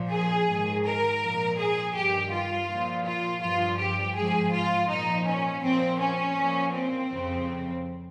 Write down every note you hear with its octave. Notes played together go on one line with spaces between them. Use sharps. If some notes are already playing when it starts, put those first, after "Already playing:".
Already playing: A#2 F3
G#4
G#2 D#3
A#4
A#2 F3
G#4
G2 D#3 G4
F4
A#2 F3
F4
G2 F3 F4
G4
G#2 F3 G#4
F4
A#2 F3 D#4
C#4
A#2 F3 C4
C#4
A#2
F3
C4
F2 C#3 F3